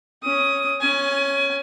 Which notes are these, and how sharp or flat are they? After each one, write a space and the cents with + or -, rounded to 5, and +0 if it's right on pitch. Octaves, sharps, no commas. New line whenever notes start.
C#4 +0 D#6 +15
C#4 +0 G#5 +25